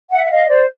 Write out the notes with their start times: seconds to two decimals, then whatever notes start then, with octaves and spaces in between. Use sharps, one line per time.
0.10 E5 F#5
0.24 F#5
0.30 D#5 F5
0.48 C5 D5